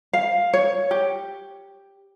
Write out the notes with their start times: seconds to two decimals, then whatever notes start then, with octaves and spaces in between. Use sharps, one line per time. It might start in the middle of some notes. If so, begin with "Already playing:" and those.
0.13 F5
0.53 C#5
0.91 G4